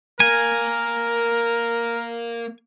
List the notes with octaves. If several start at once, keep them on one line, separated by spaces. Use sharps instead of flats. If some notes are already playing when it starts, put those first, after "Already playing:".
A#3 A#4 G#5